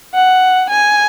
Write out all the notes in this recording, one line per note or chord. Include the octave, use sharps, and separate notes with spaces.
F#5
G#5